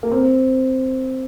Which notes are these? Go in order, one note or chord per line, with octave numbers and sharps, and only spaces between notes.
A#3
C4